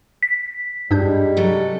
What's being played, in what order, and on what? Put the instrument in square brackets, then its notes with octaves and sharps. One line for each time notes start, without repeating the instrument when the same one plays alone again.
[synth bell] B6
[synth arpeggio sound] G2 D4 G6 [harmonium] G3 G#3
[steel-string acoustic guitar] C3 F#3 A4